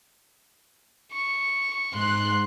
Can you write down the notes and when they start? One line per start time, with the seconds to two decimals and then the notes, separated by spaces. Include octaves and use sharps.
1.12 C#6
1.95 G#2 C6 F#6